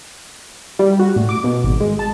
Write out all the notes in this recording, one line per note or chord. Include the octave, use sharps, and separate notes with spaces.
G3
F#4
A2
D6
B2
G#1
G#3
A5